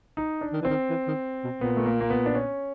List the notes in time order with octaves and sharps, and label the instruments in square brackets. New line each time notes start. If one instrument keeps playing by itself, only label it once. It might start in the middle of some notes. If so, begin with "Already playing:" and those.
[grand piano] D#4
D4
[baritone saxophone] D#3
E3
[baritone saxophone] D#3 [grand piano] C4
[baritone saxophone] E3
D#3
B2
[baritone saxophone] A#2 [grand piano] B3
[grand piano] A3
A#3
A#3
B3
D4
C#4